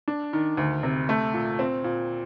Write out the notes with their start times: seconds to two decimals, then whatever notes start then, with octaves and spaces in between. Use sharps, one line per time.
0.08 D4
0.33 D#3
0.57 D2
0.83 C3
1.09 A3
1.34 A#2
1.59 C4
1.84 A#2